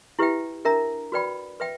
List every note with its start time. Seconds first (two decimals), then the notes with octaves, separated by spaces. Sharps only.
0.19 E4 G4 B4 E5 G5
0.65 D4 A#4 E5 A#5
1.12 F#4 B4 D5 G5 B5
1.60 B4 E5 G5